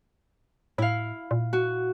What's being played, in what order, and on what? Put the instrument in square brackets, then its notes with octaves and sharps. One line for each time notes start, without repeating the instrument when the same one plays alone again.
[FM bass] A2 [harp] E4 F5
[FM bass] A#2
[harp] F#4